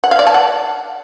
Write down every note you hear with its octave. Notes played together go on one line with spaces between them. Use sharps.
F#5
F5
D5
A5
F#5